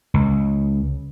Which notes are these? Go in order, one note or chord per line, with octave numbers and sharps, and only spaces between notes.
C#2